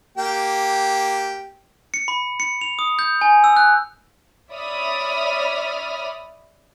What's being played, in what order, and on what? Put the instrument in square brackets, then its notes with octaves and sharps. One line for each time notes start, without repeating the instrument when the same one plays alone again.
[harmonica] A#3 G4 G5
[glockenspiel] C#7
B5
C#7
F7
D#6
G6
G#5
E6
F#6
[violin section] C#5 D5 E5 B5 D#6 F6